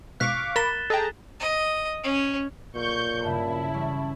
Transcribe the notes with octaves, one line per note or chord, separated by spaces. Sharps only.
G#2 B2 F5 C#6 D6 F#6 B6
A#4 B5 A6 E7 G7
G#4 A4 D#5 G5 A5 A#5
D#5
C#4
B1 A#2 C#6 G6
G2 C#3 E4 A5
E3 G3 C#4